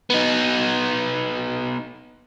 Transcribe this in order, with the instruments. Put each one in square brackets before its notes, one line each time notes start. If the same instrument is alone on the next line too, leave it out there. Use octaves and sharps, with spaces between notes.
[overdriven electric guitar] B3 D#4